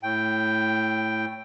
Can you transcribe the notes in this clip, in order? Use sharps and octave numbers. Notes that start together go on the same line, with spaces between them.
A2 G5